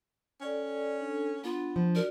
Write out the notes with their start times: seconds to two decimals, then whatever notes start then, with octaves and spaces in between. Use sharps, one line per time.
0.41 C#4 A4 D5 G5
1.01 D4 A4
1.44 B3 D4 F4
1.76 F3
1.95 F4 F#4 A#4 D5